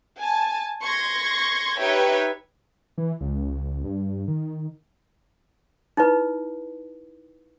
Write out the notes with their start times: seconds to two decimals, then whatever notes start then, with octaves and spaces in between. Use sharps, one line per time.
0.19 G#5 A5
0.83 C6 C#6 G#6 A#6
1.79 D#4 G4 B4 C#5 E5 G5
2.98 E3
3.21 C#2
3.84 G2
4.28 D#3
5.97 D#4 E4 B4